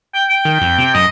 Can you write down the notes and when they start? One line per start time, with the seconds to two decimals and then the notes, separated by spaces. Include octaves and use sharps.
0.14 G5
0.29 G5
0.45 D#3
0.61 F2
0.78 C3
0.95 F#2 D#5